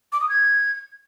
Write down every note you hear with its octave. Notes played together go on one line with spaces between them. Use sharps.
D6
D#6
G#6